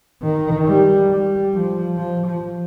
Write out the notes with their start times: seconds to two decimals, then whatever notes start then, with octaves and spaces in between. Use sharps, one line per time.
0.22 D#3
0.67 G3
1.10 G3
1.54 F3
1.97 F3
2.27 F3